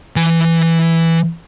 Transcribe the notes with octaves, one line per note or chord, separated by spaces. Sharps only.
E3 G#5